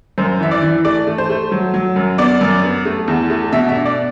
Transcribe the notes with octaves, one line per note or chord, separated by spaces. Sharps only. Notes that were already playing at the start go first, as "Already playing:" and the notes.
F#2 C5
E3 E5
D5
E3
A3 D5
A3
C5
A3
F#3
F#3
F#2
B3 D5
F#2
B3
A3
E2
A3
B2 E5
E5
D4
D5